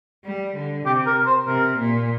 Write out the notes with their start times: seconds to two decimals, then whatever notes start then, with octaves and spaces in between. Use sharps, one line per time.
0.24 G3
0.56 D3
0.86 C3 G4
1.06 A#4
1.27 C5
1.47 C3 A#4
1.78 A#2